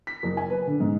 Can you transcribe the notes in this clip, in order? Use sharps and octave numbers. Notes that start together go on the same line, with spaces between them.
B6
F#1
G#5
B4
D3
G#2